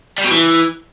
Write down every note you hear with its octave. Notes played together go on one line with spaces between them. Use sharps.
G3
B2
E3